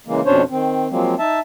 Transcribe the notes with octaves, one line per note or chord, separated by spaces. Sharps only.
C#3 E3 G#3 A#3
F2 B2 C#4 D4 C5 C#5
D#3 C4
F3 F#3 G#3 A#3 C4
D#4 E5 A5